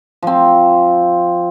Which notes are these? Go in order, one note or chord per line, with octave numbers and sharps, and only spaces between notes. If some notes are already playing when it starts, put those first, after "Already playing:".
F3 C4